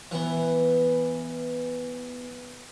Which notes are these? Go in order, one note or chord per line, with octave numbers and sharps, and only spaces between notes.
E3 B3